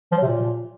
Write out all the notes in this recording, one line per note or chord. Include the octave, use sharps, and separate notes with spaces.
F3
F#3
C3
A#2